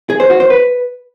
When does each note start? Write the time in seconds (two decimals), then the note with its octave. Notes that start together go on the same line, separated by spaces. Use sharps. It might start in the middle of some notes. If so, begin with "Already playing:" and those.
0.10 G#4
0.20 C5
0.30 F#4
0.40 C5
0.50 B4